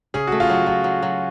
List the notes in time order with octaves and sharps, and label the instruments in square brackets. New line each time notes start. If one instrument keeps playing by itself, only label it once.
[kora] C#3 [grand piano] G#4
[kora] A3 [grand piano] F#4
[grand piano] F4
[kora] F#3 [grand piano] F#4
[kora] F#3 [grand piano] F4
[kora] F#3
F#3